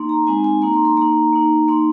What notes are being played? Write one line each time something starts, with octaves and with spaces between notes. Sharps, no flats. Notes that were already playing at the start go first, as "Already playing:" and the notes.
Already playing: A#3 D#4 C6
A#5
G#3 C4 D#4 G#5
G#5
A#3 D#4 A#5
C6
C6
A#3 D#4 A#5
A#3 D#4
A#3 D#4 C6